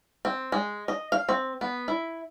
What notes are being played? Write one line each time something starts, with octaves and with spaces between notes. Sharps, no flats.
C4
G#3
D#5
F5
C4
B3
E4